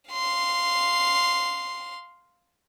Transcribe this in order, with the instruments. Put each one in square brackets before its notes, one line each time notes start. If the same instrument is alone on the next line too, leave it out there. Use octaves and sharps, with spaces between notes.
[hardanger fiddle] F5 C6